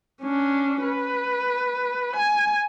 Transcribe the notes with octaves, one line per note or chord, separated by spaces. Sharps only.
C#4 D4
B4
G#5